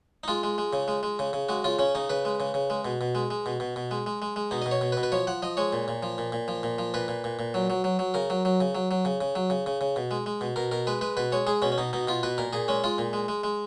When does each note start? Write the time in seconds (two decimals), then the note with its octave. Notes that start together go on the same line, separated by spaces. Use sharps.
0.24 D#4
0.28 G#3 F4
0.43 G#3
0.58 G#3
0.73 C#3
0.88 G#3
1.03 G#3
1.19 C#3
1.33 C#3
1.49 G#3 F#4
1.64 C#3 F4
1.79 C#3 C#4
1.95 C#3 D#4
2.09 C#3 B4
2.25 G#3
2.40 C#3
2.54 C#3
2.70 G#3
2.85 B2
3.01 B2
3.15 G#3
3.31 G#3
3.46 B2
3.60 B2
3.76 B2
3.91 G#3
4.06 G#3
4.22 G#3
4.36 G#3
4.51 B2 D#4
4.62 B2 D#5
4.71 C#5
4.81 B2
4.92 B4
4.97 B2
5.03 B4
5.12 F3 C#5
5.27 F3 F#5
5.42 F3 D#5
5.57 G#3 C#5
5.73 A#2
5.88 A#2
6.03 F3
6.18 A#2
6.32 A#2
6.48 F3
6.63 A#2
6.79 F3
6.94 A#2 B4
7.08 A#2
7.24 A#2
7.39 A#2
7.54 F#3
7.70 F#3
7.84 F#3
7.99 F#3
8.14 C#3 A#4
8.30 F#3
8.45 F#3
8.61 C#3
8.75 F#3
8.91 F#3
9.05 C#3
9.21 C#3
9.36 F#3
9.50 C#3
9.66 C#3
9.81 C#3
9.96 B2
10.11 G#3
10.26 G#3
10.41 B2
10.56 B2 A#4
10.71 B2 A#4
10.87 G#3 B4
11.01 G#3 B4
11.17 B2 B4
11.32 G#3 C#5
11.47 G#3 G#4
11.62 B2 C#4
11.72 C#4
11.78 B2 D#4
11.93 B2 D#4
12.08 B2 F4
12.23 B2 B4
12.38 A#2 A#4
12.53 A#2 G#4
12.68 G#3 C#4
12.84 G#3 F4
12.98 A#2
13.13 G#3
13.28 G#3
13.44 G#3